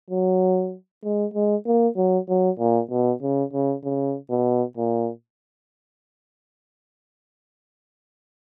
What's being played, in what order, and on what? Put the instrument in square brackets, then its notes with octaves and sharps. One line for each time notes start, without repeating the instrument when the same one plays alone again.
[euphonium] F#3
G#3
G#3
A#3
F#3
F#3
A#2
B2
C#3
C#3
C#3
B2
A#2